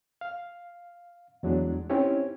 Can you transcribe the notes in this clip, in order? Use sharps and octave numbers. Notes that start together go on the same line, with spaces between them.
F5
E2 F#3 G#3 D4
C4 C#4 D#4 E4 G4 C#5